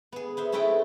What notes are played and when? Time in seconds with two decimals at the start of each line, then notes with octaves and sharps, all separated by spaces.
0.12 B3 G#4
0.37 B3 C5 E5
0.52 A3 C4 C#4 E4 B4 G5